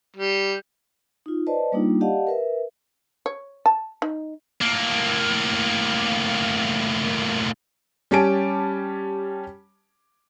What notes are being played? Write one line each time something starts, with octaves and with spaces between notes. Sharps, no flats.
G3
D#4 F4
B4 C5 D5 D#5 A5
G3 A#3 D4 D#4 F4
G4 D5 D#5 F5 F#5 A5
A#4 B4 E5
C#5
A5
D#4
A2 A#3
G3 C#4 G4 G#5 A5 D7